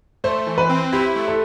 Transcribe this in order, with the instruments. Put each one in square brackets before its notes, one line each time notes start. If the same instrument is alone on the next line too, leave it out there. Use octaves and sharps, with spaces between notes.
[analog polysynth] A3 [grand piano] C5
[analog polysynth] E3
[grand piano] B4
[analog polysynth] C4
[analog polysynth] E4 [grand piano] G4
[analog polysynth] A3
[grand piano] A4